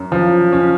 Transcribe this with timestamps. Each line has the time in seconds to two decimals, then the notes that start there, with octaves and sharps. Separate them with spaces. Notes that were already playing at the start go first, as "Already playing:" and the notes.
Already playing: F#2
0.12 F3
0.52 C#4